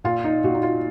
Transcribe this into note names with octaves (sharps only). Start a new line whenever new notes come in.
A#2 F4
D#4
A#2 F#4
D#4
F4